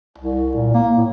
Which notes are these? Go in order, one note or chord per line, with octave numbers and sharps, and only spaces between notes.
C2
A#2
A#3
A2